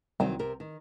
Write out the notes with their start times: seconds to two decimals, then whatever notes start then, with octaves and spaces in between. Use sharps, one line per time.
0.20 C2 D#3 F#3 C4
0.39 C3 A#4
0.60 D#3